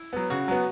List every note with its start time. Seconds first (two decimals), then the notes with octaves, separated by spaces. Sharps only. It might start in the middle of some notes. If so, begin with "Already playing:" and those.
Already playing: E4
0.13 F#3 B3
0.30 C#3 F#4
0.48 F#3 B3